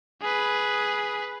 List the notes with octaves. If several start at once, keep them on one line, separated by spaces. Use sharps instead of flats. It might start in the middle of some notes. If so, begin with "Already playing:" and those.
G#4 B4